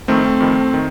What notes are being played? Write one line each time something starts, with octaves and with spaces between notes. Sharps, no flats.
F2 D#3 A3 C4
F2 D#3
D#3